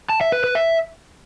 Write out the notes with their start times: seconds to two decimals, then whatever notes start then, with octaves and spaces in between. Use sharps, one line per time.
0.09 A5
0.21 E5
0.32 B4
0.44 B4
0.55 E5